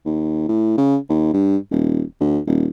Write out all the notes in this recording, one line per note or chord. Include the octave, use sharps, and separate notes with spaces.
D#2
A2
C#3
D#2
G2
D#1
D2
D#1